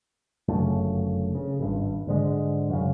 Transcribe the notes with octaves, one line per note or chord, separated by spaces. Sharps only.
G1 F#2 C#3 A3
C#3
G#1 G2
G#2 D3 G#3
F#2 C#3